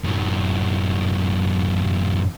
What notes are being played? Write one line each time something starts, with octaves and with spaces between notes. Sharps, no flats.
F#2 A2